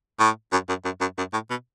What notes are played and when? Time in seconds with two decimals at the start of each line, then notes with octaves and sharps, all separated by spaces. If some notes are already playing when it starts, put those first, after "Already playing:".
0.20 A2
0.52 F#2
0.68 F#2
0.85 F#2
1.01 F#2
1.18 F#2
1.33 A2
1.50 B2